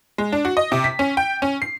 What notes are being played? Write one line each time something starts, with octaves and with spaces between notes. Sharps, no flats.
G#3
D4
F#4
D#5
C3
B6
C#4
G5
C#4
C7